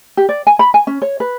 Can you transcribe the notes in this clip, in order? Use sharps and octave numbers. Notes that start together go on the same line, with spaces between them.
G4
D5
G#5
B5
G#5
C#4
C#5
B4